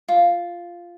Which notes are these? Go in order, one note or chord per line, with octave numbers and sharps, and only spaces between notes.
F4